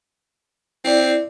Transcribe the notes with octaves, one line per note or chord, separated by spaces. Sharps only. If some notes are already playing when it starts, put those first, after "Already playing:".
C4 E4 D5